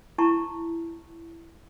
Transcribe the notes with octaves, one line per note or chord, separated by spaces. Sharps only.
E4 A5 A#5 C#6